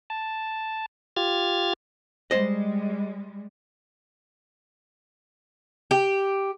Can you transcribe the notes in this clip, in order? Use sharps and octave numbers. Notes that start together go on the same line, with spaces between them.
A5
F4 G4 F6 G#6 A6
G3 G#3 C5 D#5
G4